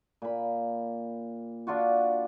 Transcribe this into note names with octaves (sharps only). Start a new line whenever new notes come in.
A#2 B5
D4 F4 F#4